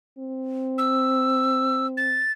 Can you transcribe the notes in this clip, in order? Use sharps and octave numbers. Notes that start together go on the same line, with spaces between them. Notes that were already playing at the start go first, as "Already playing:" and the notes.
C4
E6
A6